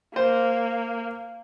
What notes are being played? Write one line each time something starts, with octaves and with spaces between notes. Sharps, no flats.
A#3 C5